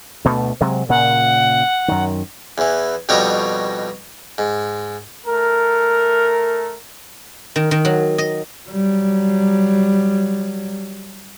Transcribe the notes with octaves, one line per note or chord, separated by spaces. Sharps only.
D2 B2 A3
C3 F#3 G#3
A#2 C#3 F#5
F#2 D#3
E2 E3
F2 B2 G3 D#4 C#5 A#5
G#2
A3 A#4
D#3
D#3
F#3
D#5
F#3 G3